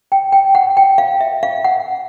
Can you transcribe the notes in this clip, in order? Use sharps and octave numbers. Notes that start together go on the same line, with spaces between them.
G5
G5
F#5
G5
F5
E5
F5
F#5